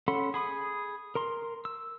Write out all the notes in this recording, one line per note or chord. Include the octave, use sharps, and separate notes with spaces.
C#4 A4 F#5 B5 C6
G#4 B5 D#6
A#4 A#5 C6
E6